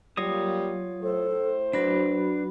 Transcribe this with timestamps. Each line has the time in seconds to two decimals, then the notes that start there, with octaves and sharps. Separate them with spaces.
0.17 F#3 G3 A#3 F4 C#5 D#6
1.02 A2 A4 C5
1.73 F#3 D4 F#4 B4 B5